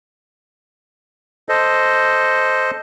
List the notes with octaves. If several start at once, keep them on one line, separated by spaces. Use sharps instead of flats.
A4 C5 D#5